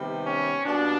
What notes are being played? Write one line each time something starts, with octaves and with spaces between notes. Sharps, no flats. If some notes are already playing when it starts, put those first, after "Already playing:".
Already playing: C3 D#3 G3 B3
C#4
B2 G3 A#3 D4